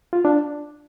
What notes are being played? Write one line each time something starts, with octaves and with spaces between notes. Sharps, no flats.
F4
D4